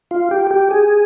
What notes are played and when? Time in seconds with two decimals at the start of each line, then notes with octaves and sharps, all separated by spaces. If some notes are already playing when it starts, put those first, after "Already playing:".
0.11 F4
0.31 G4
0.51 G4
0.71 G#4